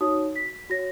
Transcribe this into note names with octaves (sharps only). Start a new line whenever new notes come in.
D#4 F#4 C#5 D#6
B6
F#4 C#5 A#6